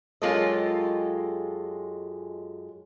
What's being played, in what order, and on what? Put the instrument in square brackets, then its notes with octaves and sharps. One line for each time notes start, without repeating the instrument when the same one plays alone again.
[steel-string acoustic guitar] F#2 G#3 F4 G4 A4 D#5